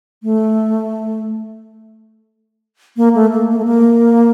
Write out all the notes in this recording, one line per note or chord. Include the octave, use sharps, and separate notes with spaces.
A3
A#3
A3
A#3
A#3
A3
A#3